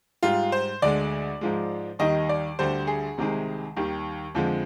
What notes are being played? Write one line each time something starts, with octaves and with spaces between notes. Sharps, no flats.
G#2 G3 F4
C5
D2 D3 G#3 D5
G#2 F3 G#3
D#2 D#3 G3 D#5
D5
D2 D3 G3 C5
G#4
C2 C3 D#3 G#3
D#2 D#3 G3
F2 D3 F3 G#3